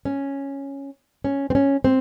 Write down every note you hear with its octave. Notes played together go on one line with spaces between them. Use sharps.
C#4
C#4
C4
C#4
C4